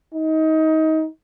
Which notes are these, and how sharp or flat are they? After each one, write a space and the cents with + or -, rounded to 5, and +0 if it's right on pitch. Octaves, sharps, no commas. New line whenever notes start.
D#4 +25